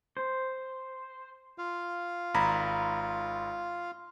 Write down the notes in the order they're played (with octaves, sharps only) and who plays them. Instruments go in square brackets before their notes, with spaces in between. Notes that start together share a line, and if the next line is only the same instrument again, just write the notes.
[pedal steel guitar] C5
[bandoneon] F4 F5
[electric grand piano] G#1 A#5 B5